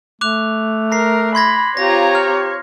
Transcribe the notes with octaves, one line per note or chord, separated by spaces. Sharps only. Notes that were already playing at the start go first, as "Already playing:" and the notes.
A3 D6 F#6 F7
A#4 A#6 C7
B5 C6 G#6 A#6
C4 F4 G4 C#5 A#5 A#6
F6